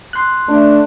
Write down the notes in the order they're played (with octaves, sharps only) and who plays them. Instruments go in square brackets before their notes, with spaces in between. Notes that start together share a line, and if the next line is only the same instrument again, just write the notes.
[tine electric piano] C6 F#6
[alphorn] A3 [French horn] D4